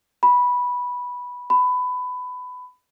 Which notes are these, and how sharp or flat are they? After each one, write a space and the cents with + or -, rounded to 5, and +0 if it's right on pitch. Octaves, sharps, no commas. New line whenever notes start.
B5 -10
B5 +20